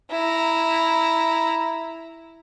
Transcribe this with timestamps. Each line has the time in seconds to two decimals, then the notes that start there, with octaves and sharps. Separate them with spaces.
0.11 E4 A#5